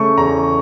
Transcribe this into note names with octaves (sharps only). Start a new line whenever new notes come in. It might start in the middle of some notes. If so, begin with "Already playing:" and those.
Already playing: C#3 A3 C#6
E2 A#5